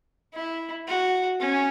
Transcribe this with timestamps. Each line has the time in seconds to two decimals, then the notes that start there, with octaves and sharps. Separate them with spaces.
0.34 E4
0.88 F#4
1.40 C#4